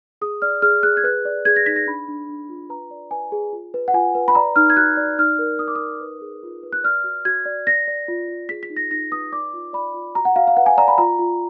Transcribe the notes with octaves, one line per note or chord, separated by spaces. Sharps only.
G#4 D#6
D5 F6
G#4 F6
G#4 F#6
G#6
B4 F#6
D5
G#4 G#6
A#6
D#4 B6
A#6
D4 B5
D4
D4
F4
B4 A#5
D5
B4 G#5
G#4
F4
B4
F#5
F4 G#5
B4
B5
D5 A#5
D#4 F6
G#6
F#4 F#6
D5
D#4 F6
A#4
D#4 D#6
D6
A#4 D#6
B4
G#4
F4
B4
F#6
D5 F6
F#4
F#4 G#6
D5
D5 A#6
D5
F4
F4
G#4 B6
B6
D#4
A#6
D#4 A#6
B4 D#6
D5 D6
F4
D5 B5
F4
F#4 A#5
F#5
F#4 F5
F5
B4 F#5
G#5
D5 A#5
B5
F4 A#5
F4